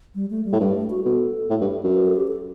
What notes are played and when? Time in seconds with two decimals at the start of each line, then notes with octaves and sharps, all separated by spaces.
0.15 G3
0.30 A3
0.45 G3
0.53 A2
0.60 G2 G3
0.75 A3
0.90 F#4
1.05 B2 A4
1.50 A2
1.61 G2
1.84 F#2
1.95 B4
2.06 A4
2.16 G4
2.27 A4